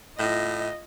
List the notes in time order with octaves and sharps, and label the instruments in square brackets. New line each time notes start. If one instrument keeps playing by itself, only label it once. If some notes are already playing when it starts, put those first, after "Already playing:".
[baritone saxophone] A2 [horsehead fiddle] F4 D#5